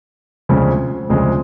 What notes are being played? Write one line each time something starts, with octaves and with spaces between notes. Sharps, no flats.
D2 C#3 F3 G#3 C4
D2 C#3 F3 G#3 C4